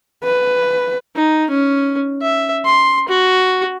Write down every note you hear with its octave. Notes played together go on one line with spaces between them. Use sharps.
B4
D#4
C#4
E5
C6
F#4